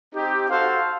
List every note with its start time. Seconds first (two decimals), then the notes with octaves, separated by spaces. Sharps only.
0.14 C4 D#4 G4
0.48 F#4 A4 C5 F5